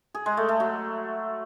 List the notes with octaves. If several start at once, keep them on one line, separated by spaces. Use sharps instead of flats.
G#4
G#3
A3
A3
F#3